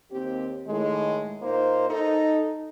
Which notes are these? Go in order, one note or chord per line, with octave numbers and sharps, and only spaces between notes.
D#2 C4 G4
A2 D#3 G#3
A#2 A#3 D#4 C5
D#4 A4